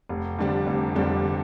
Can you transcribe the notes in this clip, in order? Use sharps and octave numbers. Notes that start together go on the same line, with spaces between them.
F1
F2 D3 G3 D4
F1
F2 D3 G3 D4